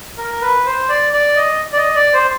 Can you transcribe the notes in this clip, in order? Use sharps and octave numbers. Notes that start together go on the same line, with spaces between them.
A#4
B4
C5
D5
D5
D#5
D5
D#5
D5
C5